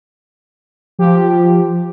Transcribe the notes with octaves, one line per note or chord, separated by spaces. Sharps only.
F3 G4